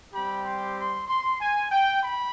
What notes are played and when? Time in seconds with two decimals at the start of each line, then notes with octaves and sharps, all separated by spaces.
0.14 G3 C4 G4 B5
0.45 C6
0.77 C6
1.08 C6
1.40 G#5
1.71 G5
2.03 B5